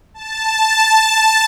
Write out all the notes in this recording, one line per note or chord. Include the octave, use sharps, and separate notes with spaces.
A5
A5